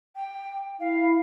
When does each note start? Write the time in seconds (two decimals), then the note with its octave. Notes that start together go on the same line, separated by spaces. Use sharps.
0.16 G5
0.80 E4 F5